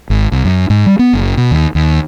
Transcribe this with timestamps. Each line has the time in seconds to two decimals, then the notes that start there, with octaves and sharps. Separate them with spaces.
0.10 G#1
0.32 C2
0.45 F#2
0.70 G#2
0.86 G3
0.99 B3
1.13 F#1
1.37 B2
1.51 D#2
1.75 D#2